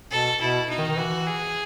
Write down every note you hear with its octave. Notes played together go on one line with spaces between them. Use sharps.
B2 A4
B2 E4
D#4
D#3
D#3
E3 F#4
G#4